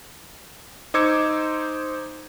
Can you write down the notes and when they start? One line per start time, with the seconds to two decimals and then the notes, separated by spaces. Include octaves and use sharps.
0.94 D#4 C5 D6 E6 G#6 C#7